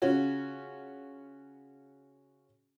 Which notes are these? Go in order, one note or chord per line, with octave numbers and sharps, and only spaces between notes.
C#3 C#4 F4 F#4